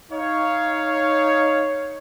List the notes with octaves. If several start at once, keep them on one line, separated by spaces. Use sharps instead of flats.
D#4 C#5 F5